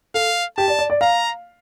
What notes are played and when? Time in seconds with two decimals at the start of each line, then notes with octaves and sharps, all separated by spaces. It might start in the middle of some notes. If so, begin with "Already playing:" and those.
0.14 A4 F5
0.57 G4 A5
0.68 D5
0.79 D5
0.90 D5
1.01 F5 A#5